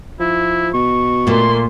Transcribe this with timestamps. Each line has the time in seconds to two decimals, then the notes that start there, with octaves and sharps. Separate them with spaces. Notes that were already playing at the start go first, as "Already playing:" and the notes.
0.20 F3 E4
0.74 B2 C#6
1.27 A#2 A3 A#3 C6